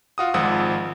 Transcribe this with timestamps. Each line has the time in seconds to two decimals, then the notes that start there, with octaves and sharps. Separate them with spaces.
0.18 F4 F#4 D#6
0.34 G#1 G#2 F3 F#5 D#6 E6